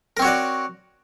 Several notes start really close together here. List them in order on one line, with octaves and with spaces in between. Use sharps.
A#4 C4 C#5 F#4 D5